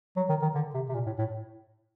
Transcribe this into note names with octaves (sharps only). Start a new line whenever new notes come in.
F#3
D#3
D#3
D3
C3
C3
A#2
A2
A2